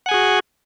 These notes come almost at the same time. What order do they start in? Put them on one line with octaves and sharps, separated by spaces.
F#5 G#5 G#4 F#4